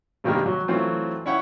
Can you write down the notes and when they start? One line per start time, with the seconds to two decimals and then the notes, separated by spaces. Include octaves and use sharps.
0.24 G2 C3 D#3 G3 G#3 A#3
0.46 F#3
0.68 E3 F#3 A3 C4 F4
1.26 C#4 E4 C#5 F#5 G5